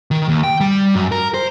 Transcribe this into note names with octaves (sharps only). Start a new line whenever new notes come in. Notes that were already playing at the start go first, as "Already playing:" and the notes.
D#3
D#2
G5
G3
F#2
A#4
C5